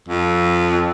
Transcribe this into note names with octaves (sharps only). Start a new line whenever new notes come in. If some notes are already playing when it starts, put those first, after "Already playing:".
F2